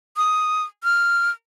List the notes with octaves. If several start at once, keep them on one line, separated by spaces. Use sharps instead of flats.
D#6
F6